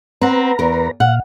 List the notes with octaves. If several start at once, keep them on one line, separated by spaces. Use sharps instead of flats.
C4 B4 F#5 A#5
E2 A#4
A#2 F5 F#5